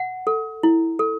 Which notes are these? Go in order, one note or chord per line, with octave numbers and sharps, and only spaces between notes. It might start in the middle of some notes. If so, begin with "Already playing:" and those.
Already playing: F#5
A4
E4
A4